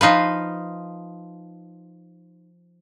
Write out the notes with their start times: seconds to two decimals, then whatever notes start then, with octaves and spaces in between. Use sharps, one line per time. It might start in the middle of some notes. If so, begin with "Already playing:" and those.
0.01 F3 D#4 F4 B4